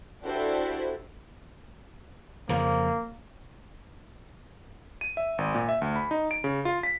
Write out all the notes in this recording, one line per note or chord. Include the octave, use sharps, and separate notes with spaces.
D4 E4 F#4 G4 A4 C5
F2 C#3 F3 A#3
D#7
E5
G#1
A#2
E5
D2
B5
D#4
D7
C#3
F4
B6